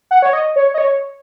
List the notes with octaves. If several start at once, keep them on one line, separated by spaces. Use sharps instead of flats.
F#5
C#5
D#5
C#5
D#5
C#5